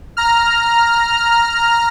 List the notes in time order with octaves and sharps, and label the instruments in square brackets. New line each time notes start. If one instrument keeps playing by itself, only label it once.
[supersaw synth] A#5 F6